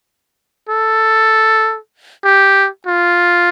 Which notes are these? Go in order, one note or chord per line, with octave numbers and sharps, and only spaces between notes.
A4
G4
F4